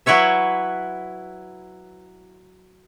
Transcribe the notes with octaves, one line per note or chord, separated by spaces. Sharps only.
F#3 E4 B4 C#5 E5